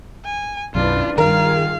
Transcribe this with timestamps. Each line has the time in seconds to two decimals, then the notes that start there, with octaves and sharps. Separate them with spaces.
0.25 G#5
0.75 B1 F#2 D4 E4 F4 B4
1.18 G2 D#3 F4 G#4 A#4 F5